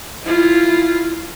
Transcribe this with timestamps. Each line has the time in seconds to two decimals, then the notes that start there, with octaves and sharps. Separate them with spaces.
0.24 E4 F4